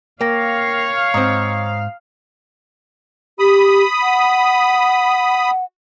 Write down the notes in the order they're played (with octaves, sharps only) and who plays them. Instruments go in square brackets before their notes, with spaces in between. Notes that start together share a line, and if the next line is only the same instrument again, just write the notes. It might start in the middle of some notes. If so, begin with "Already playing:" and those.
[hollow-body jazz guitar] A#3 [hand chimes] A#4 G5 A#6 [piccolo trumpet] C#5 [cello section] F5
[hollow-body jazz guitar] G#2 C4 [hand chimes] A#5 D#6
[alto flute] G4 [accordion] B5 D#6
[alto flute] F#5